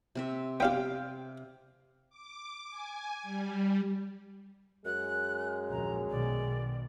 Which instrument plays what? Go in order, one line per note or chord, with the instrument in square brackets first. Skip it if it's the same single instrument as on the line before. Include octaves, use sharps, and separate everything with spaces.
[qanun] C3 C4 E5
[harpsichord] B3 D4 G4 [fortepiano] F5 G5
[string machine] D6
G#5
G3
[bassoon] F#2 [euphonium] G#3 [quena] F#6
[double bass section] A#1 D#2 [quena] A#5
[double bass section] B1 B2 D#3 [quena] D5